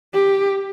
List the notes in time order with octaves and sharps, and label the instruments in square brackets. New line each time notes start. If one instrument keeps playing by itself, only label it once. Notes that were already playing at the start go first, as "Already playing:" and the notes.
[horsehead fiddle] G4